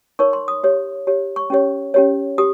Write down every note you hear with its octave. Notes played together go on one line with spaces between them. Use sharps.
D#4 A#4 C#5 C#6
C6
D#6
G4 C#5
G4 C#5
C#6
C#4 G4 C#5
C#4 G4 C#5
G4 D#6